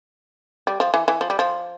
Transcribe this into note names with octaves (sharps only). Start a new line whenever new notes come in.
G3
F3
E3
E3
F3
G3
F3